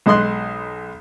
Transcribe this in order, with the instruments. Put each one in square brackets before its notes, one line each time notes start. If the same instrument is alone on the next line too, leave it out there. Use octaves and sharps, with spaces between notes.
[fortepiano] B1 G#3 D#5 C6 F#6